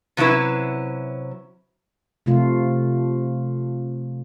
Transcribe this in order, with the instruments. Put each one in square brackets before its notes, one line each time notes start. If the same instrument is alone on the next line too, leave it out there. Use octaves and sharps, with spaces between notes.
[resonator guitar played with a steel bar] C3 F#3 C#4 E4 B4
[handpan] C3 F3 A3 F4